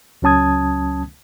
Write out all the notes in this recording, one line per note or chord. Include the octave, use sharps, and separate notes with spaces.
C#2 F#3 C#4 A5 D#6 G#6